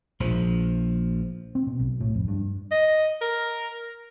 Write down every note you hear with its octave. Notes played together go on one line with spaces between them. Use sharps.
A#1 F3
C4
B2
B1
A2
F2
G2
D#5
A#4